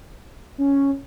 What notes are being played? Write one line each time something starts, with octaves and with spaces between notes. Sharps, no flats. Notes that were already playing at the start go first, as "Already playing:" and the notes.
C#4